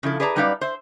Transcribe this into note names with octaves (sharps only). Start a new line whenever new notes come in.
C#3 F3 E4 A4
G#4 B4 D5 A5 A#5
F#2 G3 D#4 B4 D5 F5
C5 E5